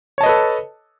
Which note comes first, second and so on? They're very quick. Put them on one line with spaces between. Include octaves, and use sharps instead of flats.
C#5 A5 D#5 B4 A4